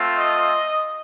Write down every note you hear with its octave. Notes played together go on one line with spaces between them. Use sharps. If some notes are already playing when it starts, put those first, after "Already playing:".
Already playing: A3 C4 F4
D#5